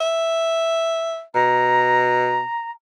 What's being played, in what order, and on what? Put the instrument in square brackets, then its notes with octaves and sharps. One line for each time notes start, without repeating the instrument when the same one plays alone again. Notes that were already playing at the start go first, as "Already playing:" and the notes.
[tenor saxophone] E5
[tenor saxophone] B2 [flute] A#5